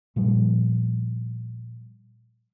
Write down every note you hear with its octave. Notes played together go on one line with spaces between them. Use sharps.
A#2 F3 G3